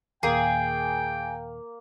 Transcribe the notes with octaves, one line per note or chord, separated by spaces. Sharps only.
D#2 A#2 A#3 G#4 G5